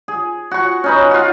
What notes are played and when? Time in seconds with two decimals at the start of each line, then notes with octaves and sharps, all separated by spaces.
0.08 G#4
0.51 F#4 C#6
0.84 C#4 D#4 B4
1.11 F4 F#4